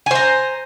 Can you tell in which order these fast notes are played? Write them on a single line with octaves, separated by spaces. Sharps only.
G#5 C5 A#5